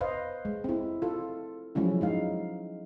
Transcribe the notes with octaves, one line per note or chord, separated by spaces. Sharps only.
B4 C5 D#5 F5
G#3
C4 E4
F4 A4
F3 F#3 G#3 C#4 E4
G#3 D#4 F5